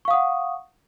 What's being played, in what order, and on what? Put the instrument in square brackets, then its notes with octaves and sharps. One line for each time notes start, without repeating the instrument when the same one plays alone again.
[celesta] C#6
F5
D#6
F#5